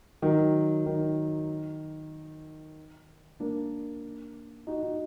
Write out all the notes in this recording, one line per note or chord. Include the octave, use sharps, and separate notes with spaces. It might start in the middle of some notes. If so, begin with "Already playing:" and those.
D#3 F#3
D#3
A#3 D4
D#4 F#4
D#4 F#4